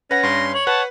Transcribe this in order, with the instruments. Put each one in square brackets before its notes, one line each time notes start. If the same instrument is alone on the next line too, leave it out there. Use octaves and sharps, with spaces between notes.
[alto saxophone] C#4 [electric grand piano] B4 F#5 [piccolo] A#6
[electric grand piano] G2 [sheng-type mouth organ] C6
[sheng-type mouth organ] C#5 [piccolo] F#7
[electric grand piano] B4 [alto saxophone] F#5 [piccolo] A5